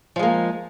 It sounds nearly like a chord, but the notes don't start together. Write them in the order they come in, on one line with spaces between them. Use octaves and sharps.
F3 G#3 A#3